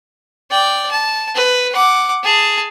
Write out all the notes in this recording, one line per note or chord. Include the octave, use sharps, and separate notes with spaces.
D5 G5
A5
B4
F#5 D6
G#4 A5